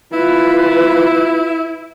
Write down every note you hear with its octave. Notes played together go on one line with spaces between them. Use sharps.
E4 F4 B4